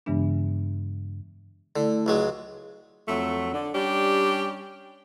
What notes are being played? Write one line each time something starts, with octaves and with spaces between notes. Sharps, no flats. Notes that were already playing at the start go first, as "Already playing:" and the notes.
G2 C#3 E3 G#3 B3 D4
D3 A3 E4 D5
C#2 F#3 G#3
F2 F#3 A3
D3
G3 C#4 D4 G4